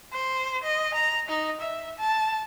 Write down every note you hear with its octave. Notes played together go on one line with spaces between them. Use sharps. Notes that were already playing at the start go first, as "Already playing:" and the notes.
C5
D#5
A#5
D#4
E5
A5